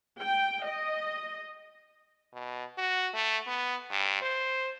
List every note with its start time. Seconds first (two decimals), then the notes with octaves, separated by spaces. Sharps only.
0.20 G5
0.65 D#5
2.33 B2
2.78 F#4
3.14 A3
3.47 B3
3.91 G2
4.22 C5